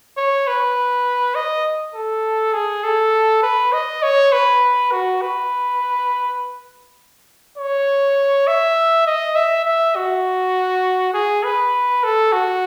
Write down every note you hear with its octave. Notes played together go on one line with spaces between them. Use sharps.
C#5
B4
D#5
A4
G#4
A4
B4
D#5
C#5
B4
F#4
B4
C#5
E5
D#5
E5
E5
F#4
G#4
B4
A4
F#4